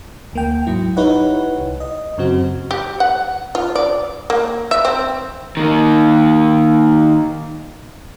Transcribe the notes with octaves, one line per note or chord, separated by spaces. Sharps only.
D2 A#3 G5
G#2 F#3 E4
D#4 E4 G4 B4 C#5 F#5
C2
D#5
F#2 C#3 C4 F#4
G4
F#5
F4
D5
A#3
E5
C4
D#3 A#3